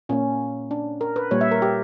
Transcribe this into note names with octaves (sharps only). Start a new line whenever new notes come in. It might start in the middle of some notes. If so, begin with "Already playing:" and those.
A#2 A#3 C#4
D4
A#4
B4
A#2 G3 A#3 C#5
E5
A#4
G4